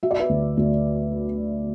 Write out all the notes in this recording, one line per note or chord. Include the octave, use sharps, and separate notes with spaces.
F#3 E5
D5
B4 E5
D2
D2